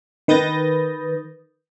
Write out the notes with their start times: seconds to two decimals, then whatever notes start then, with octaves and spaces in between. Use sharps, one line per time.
0.28 D#3 B4 D#6 G6 A6 A#6